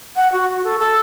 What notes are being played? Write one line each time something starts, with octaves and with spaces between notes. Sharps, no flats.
F#5
F#4
A4
A4